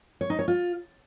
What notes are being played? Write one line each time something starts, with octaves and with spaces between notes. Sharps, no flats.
C#5
D#4
C#5
F4